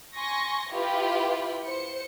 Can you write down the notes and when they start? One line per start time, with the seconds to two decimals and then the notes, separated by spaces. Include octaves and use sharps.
0.17 G#5 C6 C#6 A#6
0.71 E4 F4 G4 B4
1.65 C5 C#7